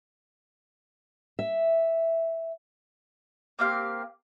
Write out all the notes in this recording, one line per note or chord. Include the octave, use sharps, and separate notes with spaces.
E5
A#3 C4 G4 F5